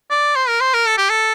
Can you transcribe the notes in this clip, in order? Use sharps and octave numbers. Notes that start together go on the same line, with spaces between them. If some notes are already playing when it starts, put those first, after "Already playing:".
D5
C5
A#4
C5
A#4
A4
G4
A4